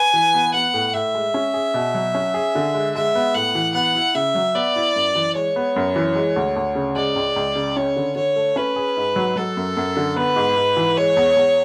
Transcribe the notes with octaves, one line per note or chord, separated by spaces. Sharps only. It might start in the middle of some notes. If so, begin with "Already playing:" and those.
Already playing: B4 G#5
E3
B3
B3 F#5
A2
A2 E5
G#3
C#4
G#4
B2
F#3
C#4
G#4
D3
G#3
G#3 E5
B3
A2 F#5
E3
B3 F#5
E4
C#3 E5
F#3
B3 D5
E4
F#2
E3
G#3 C#5
B3
F#2
E3
G#3
D2
D2
C#3
G#3 D5
C#2
C#2
C#3
C#4 C#5
D3
D3 C#5
A3
C#4 B4
G#4
G#2
F#3
F#3 A4
F#2
F#2
D3
B3 B4
G#2
G#2
E3
G#3 C#5
E2
E2